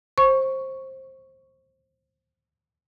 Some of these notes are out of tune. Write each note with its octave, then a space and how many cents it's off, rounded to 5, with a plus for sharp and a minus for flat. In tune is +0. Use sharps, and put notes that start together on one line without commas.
C5 +20 C#6 +0